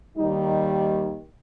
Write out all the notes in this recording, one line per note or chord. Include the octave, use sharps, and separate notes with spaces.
D#2 D#3 G3 D#4